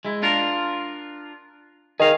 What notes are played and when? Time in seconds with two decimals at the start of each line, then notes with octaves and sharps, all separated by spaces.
0.05 G#3 E4
0.23 D4 F4 A#4
2.00 D#3 G#4 D#5 F5